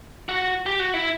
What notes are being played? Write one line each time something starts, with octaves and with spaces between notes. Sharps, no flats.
F#4
G4
F#4
E4